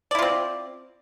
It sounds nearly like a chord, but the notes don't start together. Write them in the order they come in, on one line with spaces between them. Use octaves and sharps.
D5 E4 F4 C4